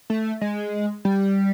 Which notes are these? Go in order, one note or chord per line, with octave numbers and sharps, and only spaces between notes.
A3
G#3
G3